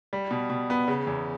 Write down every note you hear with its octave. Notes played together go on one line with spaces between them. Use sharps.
G3
B2
B2
B3
C#3
E2